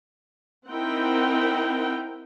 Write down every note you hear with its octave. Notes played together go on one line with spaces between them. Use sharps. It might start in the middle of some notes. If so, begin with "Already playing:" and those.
C4 D#4 E4 A#4 F#5 G5